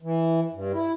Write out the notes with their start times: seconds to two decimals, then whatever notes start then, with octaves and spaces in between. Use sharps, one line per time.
0.02 E3
0.53 G2
0.74 E4